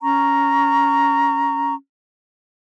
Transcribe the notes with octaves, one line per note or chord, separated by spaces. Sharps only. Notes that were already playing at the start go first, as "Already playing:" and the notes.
C#4 A#5 C#6